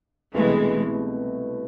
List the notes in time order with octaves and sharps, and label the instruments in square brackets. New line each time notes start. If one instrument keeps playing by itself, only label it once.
[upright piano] C2 B2 A3 C4 [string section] E3 G#3